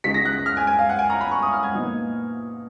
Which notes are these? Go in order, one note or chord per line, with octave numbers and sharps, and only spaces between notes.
C#2 C#3 G#3 D#4 B6
A#6
F#6
F6
G#5
G#5
F5
F#5
G#5
A#5
B5
C#6
D#6
F6
G#6
A#2 F3 B3 D#4